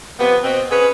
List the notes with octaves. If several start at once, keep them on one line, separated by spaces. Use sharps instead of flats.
C3 F3 B3
B2 C4
C#4 G#4 B4